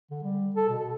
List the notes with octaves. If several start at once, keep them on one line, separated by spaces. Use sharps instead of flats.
D3
G3
A4
B2